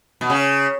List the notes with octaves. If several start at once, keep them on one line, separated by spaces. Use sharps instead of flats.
B2
C#3